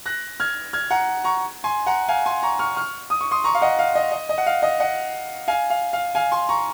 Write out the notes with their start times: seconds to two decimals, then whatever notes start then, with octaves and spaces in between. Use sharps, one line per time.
0.06 F#6 A#6
0.40 F6 G#6
0.73 F6 G#6
0.90 F#5 A#5
1.24 A#5 C#6
1.64 G#5 C6
1.87 F#5 A#5
2.09 F5 G#5
2.26 G#5 C6
2.43 A#5 C#6
2.59 C#6 F6
2.76 C#6 F6
3.10 D#6
3.21 C#6
3.31 C6 D#6
3.44 A#5 C#6
3.55 F5
3.62 D#5 F#5
3.79 F5
3.95 D#5
4.12 D#5
4.29 D#5
4.38 F#5
4.46 F5
4.62 D#5
4.80 D#5 F#5
5.48 F5 G#5
5.70 F5
5.93 F5
6.15 F5 G#5
6.32 G#5 C6
6.49 A#5 C#6